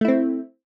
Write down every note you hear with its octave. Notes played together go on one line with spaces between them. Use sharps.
A3 C4 E4